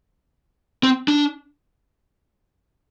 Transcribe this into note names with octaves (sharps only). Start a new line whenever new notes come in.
C4
D4